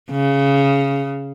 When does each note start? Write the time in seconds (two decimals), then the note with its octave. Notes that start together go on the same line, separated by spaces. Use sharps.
0.11 C#3